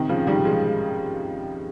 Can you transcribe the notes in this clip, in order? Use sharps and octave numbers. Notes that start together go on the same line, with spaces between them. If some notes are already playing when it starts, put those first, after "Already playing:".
Already playing: C3 D#3
C#3 F3
D#3 G3
F3 G#3